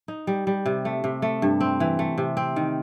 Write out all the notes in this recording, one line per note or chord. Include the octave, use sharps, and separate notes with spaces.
D#4
G3
G3
C3
A3
C3
A3
G2
C4
E3
A3
C3
C4
D#3